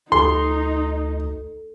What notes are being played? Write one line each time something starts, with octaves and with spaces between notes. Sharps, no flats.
D2 D#4 A4 C6